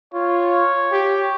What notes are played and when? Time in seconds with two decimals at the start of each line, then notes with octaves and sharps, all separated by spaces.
0.14 F4 C#5
0.92 G4